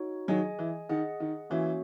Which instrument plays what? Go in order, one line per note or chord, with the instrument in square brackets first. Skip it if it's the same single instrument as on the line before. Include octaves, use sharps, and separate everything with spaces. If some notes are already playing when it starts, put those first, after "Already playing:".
Already playing: [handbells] D#4 F#4 C#5
[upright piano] D#3 F#3 [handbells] G#4 D#5 G#5
[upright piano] E3
[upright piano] D#3 [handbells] G#4 D#5 F#5
[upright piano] D#3
[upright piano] E3 [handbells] A#3 C#4 F#4 C#5 E5